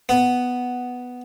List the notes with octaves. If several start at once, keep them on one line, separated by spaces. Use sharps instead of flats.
B3